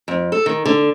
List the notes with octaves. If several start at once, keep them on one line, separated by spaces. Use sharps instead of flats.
F2
A4
D#3
D3